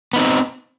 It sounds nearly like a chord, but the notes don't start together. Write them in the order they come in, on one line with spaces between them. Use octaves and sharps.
B3 D#4 C4